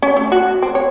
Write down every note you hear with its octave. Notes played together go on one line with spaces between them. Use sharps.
C#4
A3
F#4
C4
C#5